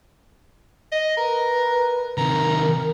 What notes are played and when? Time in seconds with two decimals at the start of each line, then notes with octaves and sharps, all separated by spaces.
0.92 D#5
1.17 A#4 B4
2.18 C3 D#3 A#4 A#5